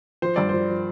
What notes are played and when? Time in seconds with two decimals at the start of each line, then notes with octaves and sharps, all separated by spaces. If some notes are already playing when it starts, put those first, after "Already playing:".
0.22 F3 C5
0.36 G2 D5
0.49 F3 C5
0.70 F3